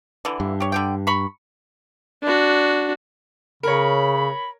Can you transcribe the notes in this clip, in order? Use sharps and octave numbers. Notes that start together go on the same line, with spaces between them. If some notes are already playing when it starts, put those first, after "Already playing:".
D3 E3
G2
G4 C#5
D3 G4 G5
A#5 B5 C#6
D4 F#4
C#3 A#4 C#5 B5